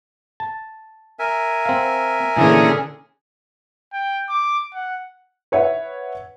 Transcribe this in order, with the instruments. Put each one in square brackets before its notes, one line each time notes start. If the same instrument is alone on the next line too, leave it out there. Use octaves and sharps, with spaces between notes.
[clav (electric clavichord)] A5
[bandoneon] A#4 E5 G#5
[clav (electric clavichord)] C4 F5
[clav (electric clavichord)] A#2 E3 [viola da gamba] D3 C#4 [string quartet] G#4
[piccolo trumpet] G5
D6
F#5
[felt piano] B4 C#5 E5 F#5